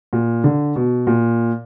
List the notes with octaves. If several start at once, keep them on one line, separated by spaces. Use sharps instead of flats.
A#2
D3
B2
A#2